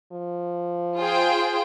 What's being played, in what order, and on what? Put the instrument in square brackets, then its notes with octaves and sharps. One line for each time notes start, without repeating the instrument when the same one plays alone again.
[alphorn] F3
[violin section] F4 G#4 C5 G5